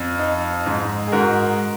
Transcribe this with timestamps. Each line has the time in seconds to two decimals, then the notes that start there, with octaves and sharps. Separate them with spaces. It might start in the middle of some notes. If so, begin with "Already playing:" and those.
Already playing: F2
0.19 D#4
0.66 G#2
1.07 G#4
1.12 G#2 F#4 A#4